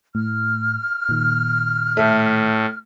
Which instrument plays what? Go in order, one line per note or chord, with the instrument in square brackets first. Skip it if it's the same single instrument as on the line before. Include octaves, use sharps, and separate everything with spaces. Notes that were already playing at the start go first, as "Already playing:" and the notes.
[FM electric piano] A2 [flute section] F6
[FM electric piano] A#2 D#3
[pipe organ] A2 [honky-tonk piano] A3